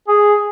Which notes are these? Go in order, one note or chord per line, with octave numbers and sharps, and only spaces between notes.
G#4